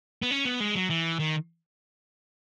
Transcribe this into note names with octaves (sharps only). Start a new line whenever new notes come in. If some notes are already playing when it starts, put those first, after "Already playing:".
B3
C#4
B3
G#3
F#3
E3
D#3